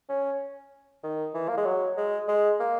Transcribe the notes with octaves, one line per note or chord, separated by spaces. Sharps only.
C#4
D#3
E3
A#3
G#3
F#3
G#3
G#3
A#3